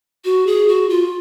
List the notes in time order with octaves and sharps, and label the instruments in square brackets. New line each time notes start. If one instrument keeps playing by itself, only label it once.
[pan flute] F#4
G#4
F#4
F4